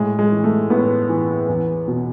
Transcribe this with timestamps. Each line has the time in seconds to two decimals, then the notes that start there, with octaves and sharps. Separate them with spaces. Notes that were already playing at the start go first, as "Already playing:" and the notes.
Already playing: A2 G#3
0.19 G#3
0.31 E3
0.44 A3
0.70 A2 B3
1.09 E3
1.48 E2
1.88 B2